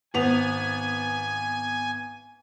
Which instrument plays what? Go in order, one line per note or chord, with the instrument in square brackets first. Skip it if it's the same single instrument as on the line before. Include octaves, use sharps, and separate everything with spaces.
[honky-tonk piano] G#1 B3 F7 [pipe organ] G#5